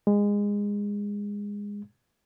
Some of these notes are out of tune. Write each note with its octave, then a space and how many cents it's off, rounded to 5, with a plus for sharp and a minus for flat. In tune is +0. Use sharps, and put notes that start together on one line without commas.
G#3 -20